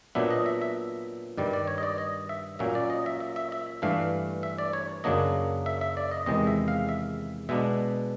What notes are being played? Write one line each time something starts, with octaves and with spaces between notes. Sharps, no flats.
A#2 F#3 B3 D4 E5
D#5
E5
E5
G2 D#3 G3 D5
D5
C#5
D#5
D5
D#5
E5
A#2 F#3 A#3 C#4 E5
D5
D#5
E5
E5
E5
E5
G2 E3 A3 D4 F5
E5
D5
C#5
F#2 C#3 F#3 A#3 D4 D#5
E5
E5
D5
D#5
E2 C3 D#3 G#3 D#5
E5
F5
E5
B2 G#3 B3 D4 E5